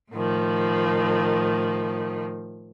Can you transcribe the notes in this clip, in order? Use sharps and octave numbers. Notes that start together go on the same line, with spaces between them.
A2 D#3 F3